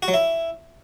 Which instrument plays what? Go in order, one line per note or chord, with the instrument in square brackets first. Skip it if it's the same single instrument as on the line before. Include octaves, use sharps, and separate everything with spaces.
[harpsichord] F#4
F#3
E4